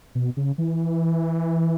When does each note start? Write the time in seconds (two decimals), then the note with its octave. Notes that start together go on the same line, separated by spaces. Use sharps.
0.15 B2
0.37 C#3
0.58 E3